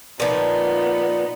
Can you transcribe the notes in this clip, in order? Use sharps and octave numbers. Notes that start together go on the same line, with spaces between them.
A#2 F3 B3 D#4